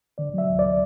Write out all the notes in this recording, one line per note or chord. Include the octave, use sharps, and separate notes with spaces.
D3 D5
F#3 E5
D2
D5